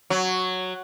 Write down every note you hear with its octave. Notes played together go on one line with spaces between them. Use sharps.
F#3